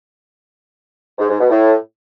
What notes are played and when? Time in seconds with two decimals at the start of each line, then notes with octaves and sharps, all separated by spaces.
1.19 G#2
1.29 G#2
1.39 B2
1.50 A2